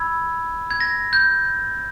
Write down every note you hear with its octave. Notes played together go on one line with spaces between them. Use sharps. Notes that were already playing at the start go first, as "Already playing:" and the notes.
Already playing: B5 E6 G#6
G#6
A#6
G6